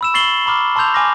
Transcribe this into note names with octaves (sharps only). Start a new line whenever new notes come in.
B5 E6 E7
C#6 A6 C7 F#7 G7
A#5 B5 D6 F6
A5 C6 D6 E6 G6 F7
G#5 B5 D6 E6 F6 A#6